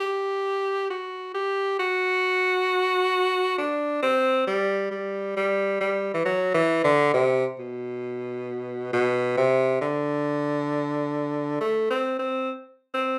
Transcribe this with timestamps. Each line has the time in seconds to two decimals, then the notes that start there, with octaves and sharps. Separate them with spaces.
0.01 G4
0.90 F#4
1.34 G4
1.79 F#4
3.58 D4
4.02 C4
4.47 G3
4.91 G3
5.37 G3
5.80 G3
6.14 E3
6.25 F#3
6.54 E3
6.84 D3
7.14 C3
7.59 B2
8.93 B2
9.37 C3
9.81 D3
11.60 A3
11.90 C4
12.19 C4
12.94 C4